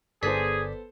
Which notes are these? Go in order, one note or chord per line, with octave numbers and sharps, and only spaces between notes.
G1 B3 G#4 A4 C5 D5 B6